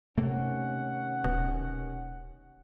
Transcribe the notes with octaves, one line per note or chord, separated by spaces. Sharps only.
D#2 C3 A3 A#3 C#4 F#5
D1 B2